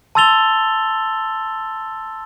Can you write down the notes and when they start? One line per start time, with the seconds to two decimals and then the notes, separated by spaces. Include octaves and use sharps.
0.15 A5 C6 E6 A6 F7 G7